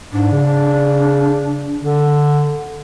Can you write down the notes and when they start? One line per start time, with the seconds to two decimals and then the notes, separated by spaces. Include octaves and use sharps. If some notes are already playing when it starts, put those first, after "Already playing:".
0.13 G#2 D4
0.32 C#3
1.81 D3